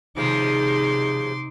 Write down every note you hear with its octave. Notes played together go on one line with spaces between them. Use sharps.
D#2 C3 F3 G#3 D#4 C6 D6